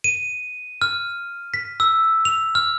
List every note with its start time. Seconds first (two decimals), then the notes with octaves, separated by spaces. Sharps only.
0.04 D#7
0.82 F6
1.54 B6
1.80 E6
2.25 F7
2.55 F6